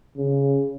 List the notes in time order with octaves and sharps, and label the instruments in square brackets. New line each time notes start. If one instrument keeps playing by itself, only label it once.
[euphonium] C#3